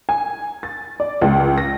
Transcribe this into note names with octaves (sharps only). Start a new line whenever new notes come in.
G#5
A6
D5
C#2
A#6